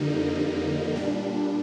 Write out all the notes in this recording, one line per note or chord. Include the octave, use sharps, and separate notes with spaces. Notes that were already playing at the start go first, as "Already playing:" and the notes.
Already playing: F2 D3 G3 A#3 D#4
A#2 G3 D4